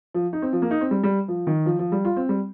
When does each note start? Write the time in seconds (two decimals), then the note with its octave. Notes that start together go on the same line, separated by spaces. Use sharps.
0.14 F3
0.33 D#4
0.42 C4
0.53 F3
0.62 A#3
0.71 D#4
0.81 C4
0.91 G3
1.03 G3
1.28 F3
1.47 D#3
1.66 F3
1.79 F3
1.92 G3
2.05 F4
2.16 C4
2.29 G3